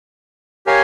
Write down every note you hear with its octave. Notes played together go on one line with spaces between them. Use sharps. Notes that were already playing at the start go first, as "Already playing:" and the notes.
G4 A#4 C#5 F5 G#5